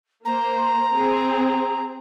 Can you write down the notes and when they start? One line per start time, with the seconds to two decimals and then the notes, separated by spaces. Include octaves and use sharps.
0.25 A#3 C5 A#5
0.93 C4 G#4